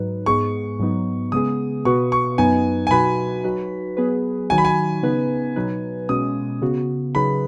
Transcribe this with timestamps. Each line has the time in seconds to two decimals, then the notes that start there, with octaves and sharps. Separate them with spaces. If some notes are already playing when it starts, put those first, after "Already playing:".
Already playing: G#2 F#3 D#4 B4
0.26 G#2 G#3 B3 G#4 C#6
0.79 G#2 F#3 B3 D#4
1.32 C#3 G#3 B3 G#4 D#6
1.85 B2 B3 F#4 B4 C#6
2.12 C#6
2.38 F#2 F#3 B3 D#4 B4 G#5
2.87 G#5
2.91 B2 F#3 D#4 F#4 B4 B5
3.44 F#3 D#4 F#4 B4
3.97 F#3 B3 G#4 B4
4.50 D#3 F#3 D#4 F#4 G#5
4.58 B5
4.65 G#5
5.03 C#3 B3 D#4 B4
5.56 B2 F#3 D#4 B4
6.09 B2 G#3 C#4 D#6
6.62 C#3 B3 F#4
7.15 C#3 F#3 D#4 G#4 B4 B5